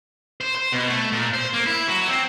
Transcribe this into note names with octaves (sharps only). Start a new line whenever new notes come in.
C5
C5
B2
A3
A#2
C5
A#3
E4
F#3
C4